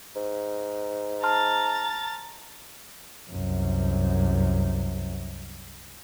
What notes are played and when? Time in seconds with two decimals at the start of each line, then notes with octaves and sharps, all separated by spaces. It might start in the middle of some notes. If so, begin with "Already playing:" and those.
0.16 G#2
1.23 A5 A#5 C6 F6 A6
3.31 C2 F#2